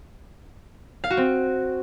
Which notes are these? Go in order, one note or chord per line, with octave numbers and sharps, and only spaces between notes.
F5
F#4
C4